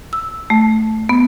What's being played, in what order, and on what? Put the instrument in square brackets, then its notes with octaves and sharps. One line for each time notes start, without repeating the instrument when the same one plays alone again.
[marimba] E6
A3
B3